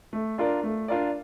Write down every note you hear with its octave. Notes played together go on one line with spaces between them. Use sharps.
A3
D4 F4 A#4 D5
A3
D4 F4 A#4 D5